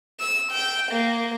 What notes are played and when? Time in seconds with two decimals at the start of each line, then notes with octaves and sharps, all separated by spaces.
0.20 E6
0.51 G5
0.92 A#3